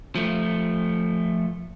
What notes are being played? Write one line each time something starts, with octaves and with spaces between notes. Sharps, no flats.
F3 A3